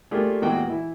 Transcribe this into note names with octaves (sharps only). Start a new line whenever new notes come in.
A3 A#3 D4 F4 G4 G#4
E2 A#2 G#3 F#4 F#5 G5
E3 E4